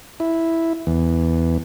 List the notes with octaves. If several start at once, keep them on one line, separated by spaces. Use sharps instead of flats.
E4
E2